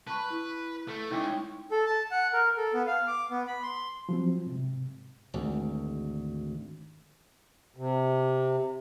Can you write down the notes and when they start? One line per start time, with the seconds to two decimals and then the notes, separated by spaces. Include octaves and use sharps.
0.07 B4 A5 C#6
0.30 E4
0.88 A3
1.10 C#2 D#4 E4 C#5 G5
1.71 A4
1.86 A5
2.11 F#5
2.33 A#4
2.57 A4
2.74 B3
2.87 F5
3.07 D6
3.30 B3
3.47 B5
3.63 C6
4.09 F3 F#3 C4
4.46 G#2 C3
5.34 G#1 D2
7.76 C3